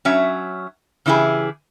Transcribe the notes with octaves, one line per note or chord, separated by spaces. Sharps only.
F#3 C#4 E5
C#3 E3 E4 G4 G#4